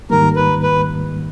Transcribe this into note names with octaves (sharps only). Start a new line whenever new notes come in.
G#2 D#3 G3 A#3 A#4
B4
B4